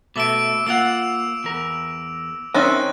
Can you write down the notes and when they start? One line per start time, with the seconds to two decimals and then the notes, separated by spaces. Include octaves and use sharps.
0.16 B2 A3 D6 E6 D7
0.67 A#3 F4 F#5 E6 D7 F7
1.44 E2 A#4
2.54 D#3 C4 C#4 D#5 E5 F#6 A6